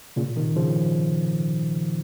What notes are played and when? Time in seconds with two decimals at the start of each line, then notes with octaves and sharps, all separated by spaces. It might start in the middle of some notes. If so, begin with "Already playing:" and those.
0.16 A#2 C#3
0.36 C3 D#3
0.56 C#3 F3